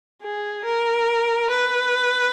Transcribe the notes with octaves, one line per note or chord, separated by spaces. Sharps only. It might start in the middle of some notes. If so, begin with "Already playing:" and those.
G#4
A#4
B4